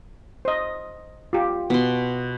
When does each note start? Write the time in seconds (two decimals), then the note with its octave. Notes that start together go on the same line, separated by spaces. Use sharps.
0.45 C5 D#5
1.33 F4 G4
1.70 B2 C6